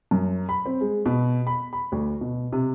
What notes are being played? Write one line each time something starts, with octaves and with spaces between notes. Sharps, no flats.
F#2
B5
C4
G#3
B2
B5
B5
D2
B2
C3